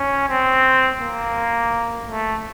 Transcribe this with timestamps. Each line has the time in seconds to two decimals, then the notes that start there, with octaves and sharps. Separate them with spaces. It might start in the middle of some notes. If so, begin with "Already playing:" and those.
Already playing: C#4
0.29 C4
1.00 A#3
2.07 A3